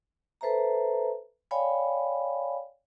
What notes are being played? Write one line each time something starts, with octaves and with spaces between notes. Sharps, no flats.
A4 B4 C5 E5 A5 A#5
C#5 D5 F5 G5 G#5 B5